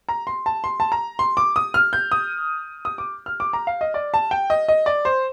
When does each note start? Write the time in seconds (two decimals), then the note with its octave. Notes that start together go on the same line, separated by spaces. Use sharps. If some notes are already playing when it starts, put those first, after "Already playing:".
0.09 A#5
0.27 C6
0.46 A5
0.64 C6
0.80 A5
0.92 A#5
1.19 C6
1.37 D6
1.56 D#6
1.74 F6
1.93 G6
2.12 D#6
2.85 D#6
2.98 D6
3.26 F6
3.40 D6
3.53 A#5
3.67 F5
3.81 D#5
3.94 D5
4.14 A5
4.31 G5
4.50 D#5
4.68 D#5
4.86 D5
5.05 C5